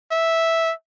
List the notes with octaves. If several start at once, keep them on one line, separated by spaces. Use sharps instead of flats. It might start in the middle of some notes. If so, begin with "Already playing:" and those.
E5